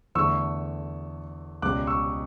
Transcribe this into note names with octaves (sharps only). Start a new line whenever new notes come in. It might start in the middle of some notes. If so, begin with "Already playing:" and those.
E2 D3 A3 C#6 E6
C#2 B2 G3 D6 F#6
C#6 E6